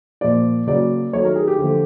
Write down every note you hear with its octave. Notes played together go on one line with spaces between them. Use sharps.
A#2 F3 A#3 D5
C#3 F#3 A#3 D5
D#3 F#3 A3 C#5
A#4
G#4
G4
D3 F3 A3